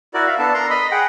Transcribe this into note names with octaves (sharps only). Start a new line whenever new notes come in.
E4 F#4 A#4 D5
E5 F5
B3 D4 A4 A5
A#4 A#5 C6
D#5 B5
G#4 F#5 G5